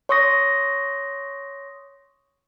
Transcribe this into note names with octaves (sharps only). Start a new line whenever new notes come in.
C#5 C6 C#6 D#6 A#6